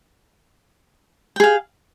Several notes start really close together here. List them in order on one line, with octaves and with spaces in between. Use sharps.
G5 G#4 F5